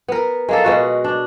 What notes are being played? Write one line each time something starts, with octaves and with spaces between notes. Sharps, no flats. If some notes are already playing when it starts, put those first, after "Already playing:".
B3 A#4
G#3 A#3 A4
B2 G#3 F#4
D4